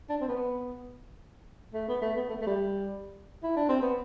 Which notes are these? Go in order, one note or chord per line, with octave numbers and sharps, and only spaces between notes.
D4
C4
B3
A3
B3
A3
B3
A3
A3
G3
E4
D4
C4
B3